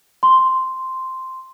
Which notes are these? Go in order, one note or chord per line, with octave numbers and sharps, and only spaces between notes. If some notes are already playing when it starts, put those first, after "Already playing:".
C6